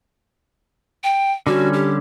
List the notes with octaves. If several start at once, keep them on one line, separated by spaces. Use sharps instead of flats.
G5
D3 G3 C#4 F#4
G4